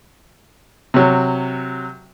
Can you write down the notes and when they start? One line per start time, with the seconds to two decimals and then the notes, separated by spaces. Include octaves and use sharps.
0.94 C3 F#3